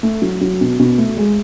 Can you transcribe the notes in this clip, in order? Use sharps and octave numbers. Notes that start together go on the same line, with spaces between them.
A3
F#3
F#3
B2
B2
A3
G#3